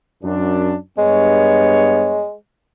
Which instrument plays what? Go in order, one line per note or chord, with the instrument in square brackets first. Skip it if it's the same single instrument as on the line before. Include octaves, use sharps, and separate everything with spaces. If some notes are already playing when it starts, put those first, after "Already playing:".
[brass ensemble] F#2 D4
[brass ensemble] G2 B3 C#5 [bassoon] G#3